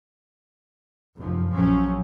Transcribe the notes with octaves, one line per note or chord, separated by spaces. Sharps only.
F1 F#2 F3
A#1 F3 F#3 C#4